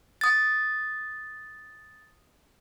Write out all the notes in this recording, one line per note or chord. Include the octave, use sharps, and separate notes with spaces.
D#6 A6